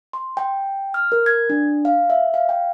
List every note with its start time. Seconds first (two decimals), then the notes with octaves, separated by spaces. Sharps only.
0.13 C6
0.37 G5
0.94 F6
1.12 A#4
1.26 G#6
1.50 D4
1.85 F5
2.10 E5
2.34 F5
2.49 G5